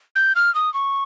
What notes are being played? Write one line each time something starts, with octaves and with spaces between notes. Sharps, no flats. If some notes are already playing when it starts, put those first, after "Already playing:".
G6
F6
D#6
C#6